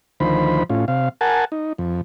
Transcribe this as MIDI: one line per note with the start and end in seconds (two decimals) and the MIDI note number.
0.20 0.63 38
0.20 0.63 51
0.20 0.63 53
0.20 0.63 72
0.20 0.63 83
0.70 0.85 45
0.70 0.85 61
0.70 0.85 65
0.88 1.09 48
0.88 1.09 77
1.21 1.45 70
1.21 1.45 78
1.21 1.45 80
1.21 1.45 81
1.52 1.73 63
1.78 2.01 41